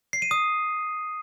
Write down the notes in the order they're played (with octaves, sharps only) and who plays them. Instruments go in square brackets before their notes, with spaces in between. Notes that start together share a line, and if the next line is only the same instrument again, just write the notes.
[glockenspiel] C7
D#7
D#6